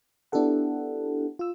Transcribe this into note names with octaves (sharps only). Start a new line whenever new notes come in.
B3 D4 E4 G4 A4 F#5
F4 E6